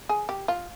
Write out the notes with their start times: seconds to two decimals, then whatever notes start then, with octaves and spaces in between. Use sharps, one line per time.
0.09 G#4
0.29 G4
0.48 F4